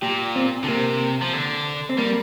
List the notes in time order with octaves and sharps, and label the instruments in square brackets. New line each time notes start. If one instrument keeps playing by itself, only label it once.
[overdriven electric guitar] A#2 [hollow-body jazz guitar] G4
[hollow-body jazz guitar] C4
[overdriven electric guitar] D3
[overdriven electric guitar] C3 [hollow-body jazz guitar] A#3
[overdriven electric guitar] F3
D3
[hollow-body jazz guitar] C4
[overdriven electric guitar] G3 [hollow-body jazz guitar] A#3